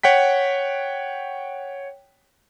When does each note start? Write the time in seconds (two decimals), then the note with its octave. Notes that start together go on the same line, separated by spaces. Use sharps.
0.03 C#5 F#5 G5 B6